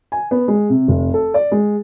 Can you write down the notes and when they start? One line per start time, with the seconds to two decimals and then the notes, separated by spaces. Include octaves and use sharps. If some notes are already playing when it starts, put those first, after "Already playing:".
0.12 G#5
0.31 B3
0.48 G#3
0.70 C3
0.88 F1
1.14 A4
1.34 D5
1.52 G#3